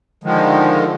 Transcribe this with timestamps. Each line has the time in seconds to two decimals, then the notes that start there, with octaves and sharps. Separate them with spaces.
0.24 D3 D#3 F3 G#3